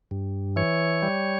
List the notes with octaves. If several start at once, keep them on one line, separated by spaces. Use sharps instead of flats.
G2
E3 C#5
G3